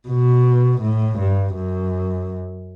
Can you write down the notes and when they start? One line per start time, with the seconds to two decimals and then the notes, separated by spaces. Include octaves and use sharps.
0.08 B2
0.82 A2
1.19 G2
1.55 F#2